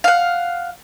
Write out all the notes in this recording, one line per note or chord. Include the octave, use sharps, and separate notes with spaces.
F5 F#5